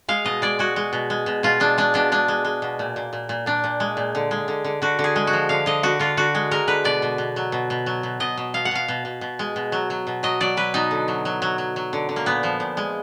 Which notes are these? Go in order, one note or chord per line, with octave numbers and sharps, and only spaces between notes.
G#3 F5
B2 D#5
G#3 D5
G#3 F#4
G#3
B2
G#3
B2
B2 F4
G#3 D4
G#3 D4
B2 D4
G#3 D4
G#3
G#3
B2
A#2
A#2
A#2
A#2
A#2 D4
A#2
G#3
A#2
D3
G#3
D3
D3
D3 F#4
D3
G#4
G#3
F#4
F3
D3 F5
D3 D#5
D3 F#4
D3 F4
D3 F#4
G#3
G#3 A#4
D3 B4
B2 D5
B2
B2
F#3
B2
B2
F#3
B2
B2 D#5
B2
B2 F5
F#5
B2 F5
B2
B2
B2
G#3
B2
F#3
F#3
B2
F#3 D#5
F#3 D5
F#3 B4
B2 D#4
D3
F#3
F#3
F#3
F#3
F#3
D3
D3
A#3
A#2 B3
F3
A#2
G#3